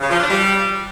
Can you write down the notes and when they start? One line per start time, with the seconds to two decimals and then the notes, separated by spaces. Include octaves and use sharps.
0.01 C#3
0.10 F3
0.20 D4
0.30 G3